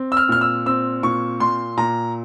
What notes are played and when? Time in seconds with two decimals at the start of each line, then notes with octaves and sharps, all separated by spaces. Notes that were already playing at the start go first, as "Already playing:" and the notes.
Already playing: C4
0.12 E6
0.17 F6
0.29 A#2 F6
0.41 E6
0.66 C4 E6
1.03 A#2 C#6
1.40 A#2 C6
1.77 A#2 A#5